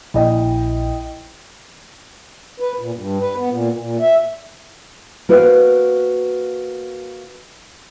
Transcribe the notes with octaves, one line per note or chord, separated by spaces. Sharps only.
A#1 E4 D#5 G5
B4
A#2
G2
B4
B3
A#2
A#2
E5
A#3 F#4 B4 C5 D#5 F5